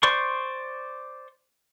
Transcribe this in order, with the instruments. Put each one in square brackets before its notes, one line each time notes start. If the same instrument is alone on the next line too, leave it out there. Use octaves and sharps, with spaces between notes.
[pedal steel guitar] C5 D5 C6 C#6